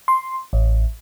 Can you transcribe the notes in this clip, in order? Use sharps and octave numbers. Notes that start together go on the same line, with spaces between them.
C6
A1